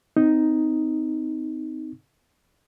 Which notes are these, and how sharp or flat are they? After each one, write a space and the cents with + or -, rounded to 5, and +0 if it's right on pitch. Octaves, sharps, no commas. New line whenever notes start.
C4 -25 D#4 +5